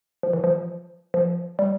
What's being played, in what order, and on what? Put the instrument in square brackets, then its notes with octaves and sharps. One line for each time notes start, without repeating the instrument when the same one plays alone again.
[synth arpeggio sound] F3
E3
F3
F3
G3